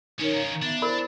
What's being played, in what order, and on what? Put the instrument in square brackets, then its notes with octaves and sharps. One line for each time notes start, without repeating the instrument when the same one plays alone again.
[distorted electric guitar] D#3 C#4 [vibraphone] D#4 A#4 C#5
[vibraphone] F5 A#5
[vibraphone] B3 E5 [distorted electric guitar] D4
[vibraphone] E4 C5 [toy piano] A#4 D5 B5